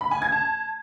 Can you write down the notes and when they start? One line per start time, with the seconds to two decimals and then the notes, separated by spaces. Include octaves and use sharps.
0.01 B5
0.11 G#5
0.22 G#6
0.32 A5